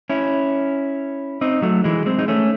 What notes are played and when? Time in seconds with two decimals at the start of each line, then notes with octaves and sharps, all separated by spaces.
0.10 C#4 E4
1.41 C4 D#4
1.62 F#3 A3
1.84 E3 G#3
2.06 G#3 C4
2.19 D#4
2.28 A3 C#4